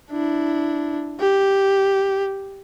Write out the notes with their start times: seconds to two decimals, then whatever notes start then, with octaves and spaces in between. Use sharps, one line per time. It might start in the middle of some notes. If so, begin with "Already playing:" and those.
0.11 D4 E4
1.20 G4